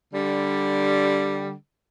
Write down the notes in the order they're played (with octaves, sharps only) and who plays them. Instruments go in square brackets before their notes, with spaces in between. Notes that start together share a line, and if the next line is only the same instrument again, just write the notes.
[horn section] D3 G3